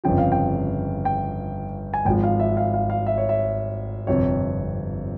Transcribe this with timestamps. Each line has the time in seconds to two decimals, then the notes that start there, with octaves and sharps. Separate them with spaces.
0.04 G1 F2 C#3 F3 G5
0.18 F5
0.32 G5
1.05 G5
1.94 G#5
2.05 G#1 G#2 F3 G5
2.23 F5
2.40 E5
2.57 F5
2.74 F5
2.90 F5
3.07 E5
3.18 C#5
3.29 E5
4.07 G1 F2 C3 F3 C#5